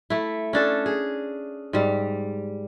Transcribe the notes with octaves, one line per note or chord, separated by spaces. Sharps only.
A3 E4
C#4 D4 A4
G#4
G#2 G3